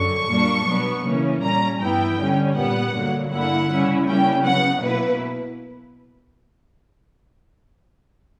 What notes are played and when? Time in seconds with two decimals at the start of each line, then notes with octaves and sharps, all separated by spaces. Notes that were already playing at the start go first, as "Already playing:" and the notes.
Already playing: F#2 D3 F#3 C#6
0.29 A#2 G3 A#3 D4
0.67 B2 F#3 B3
1.05 C#3 E3 A#3 C#4
1.43 A#2 G3 C#4 A#5
1.81 G2 E3 B3 E4 G5
2.18 D3 G3 C#4
2.56 A#2 G3 B3 F#5
2.95 G2 D3 F#3 A#3
3.33 D3 A#3 E4 F#5
3.70 C#3 G3 C#4 E4
4.08 C#3 G3 A#3 C#4 E4 G5
4.46 C#3 F#3 B3 F#5
4.84 B2 A#3 E4 B4